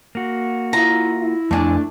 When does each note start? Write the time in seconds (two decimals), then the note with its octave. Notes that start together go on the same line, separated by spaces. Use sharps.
0.15 A#3 F#4
0.73 E4 F4 F5 A#5
1.21 E4
1.51 F2 A3 D4 F4 G#5